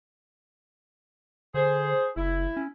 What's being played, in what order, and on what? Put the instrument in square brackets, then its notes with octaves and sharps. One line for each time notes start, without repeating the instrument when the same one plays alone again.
[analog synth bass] D3 [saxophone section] G#4 C5
[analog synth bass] F#1 [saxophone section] E4
[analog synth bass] C#4